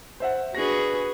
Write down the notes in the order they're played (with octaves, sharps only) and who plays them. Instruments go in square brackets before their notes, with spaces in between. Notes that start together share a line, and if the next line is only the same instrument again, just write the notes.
[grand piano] C5 E5 F#5
[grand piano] D4 A#6 [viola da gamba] F#4 G#4 B4